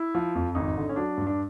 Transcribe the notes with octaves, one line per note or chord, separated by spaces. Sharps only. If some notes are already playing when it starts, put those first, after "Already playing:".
Already playing: E4
F3
F2
G#1 D#4
D3
C#4
F#3 D4
G2
D4